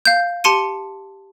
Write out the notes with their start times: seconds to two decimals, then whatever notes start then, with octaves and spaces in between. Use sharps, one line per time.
0.05 F5 G6
0.44 G4 A5 C6 C#7 D#7